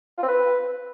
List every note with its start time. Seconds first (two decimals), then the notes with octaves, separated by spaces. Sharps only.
0.18 F4
0.23 C4
0.28 B4